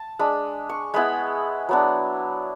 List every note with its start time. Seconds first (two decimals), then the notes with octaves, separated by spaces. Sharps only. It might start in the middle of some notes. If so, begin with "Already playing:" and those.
Already playing: A5
0.19 G#3 D4 B5
0.69 C#6
0.94 G#3 B3 E4 B5
1.69 F#3 B3 D4